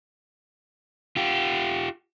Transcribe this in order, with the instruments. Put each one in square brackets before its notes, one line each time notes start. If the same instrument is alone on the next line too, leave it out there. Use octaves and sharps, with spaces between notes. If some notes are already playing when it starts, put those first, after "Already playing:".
[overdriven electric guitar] F4 G4